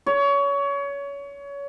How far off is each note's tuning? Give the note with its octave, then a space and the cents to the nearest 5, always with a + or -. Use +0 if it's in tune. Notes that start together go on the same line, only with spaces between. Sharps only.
C#5 +25